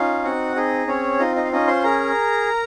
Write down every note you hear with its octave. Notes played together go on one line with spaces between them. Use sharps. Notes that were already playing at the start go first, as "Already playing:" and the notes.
Already playing: C#4 D#4 F4 F5
C4 F#4 F#5
D#4 G#4 D#5
C4 C#4 C#5
D#4 F4 D#5
D#4 D#5
F5
C#4 D#4 D#5
C5 C6
G#4 A#4 A#5